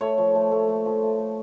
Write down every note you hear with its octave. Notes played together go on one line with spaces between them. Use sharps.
A3 C#5
F3
A3
A3
A3
F3
A3
A3